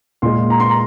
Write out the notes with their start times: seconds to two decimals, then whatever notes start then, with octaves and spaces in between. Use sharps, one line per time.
0.22 A#2 G#3 C6
0.50 A#5
0.60 C6
0.69 A#5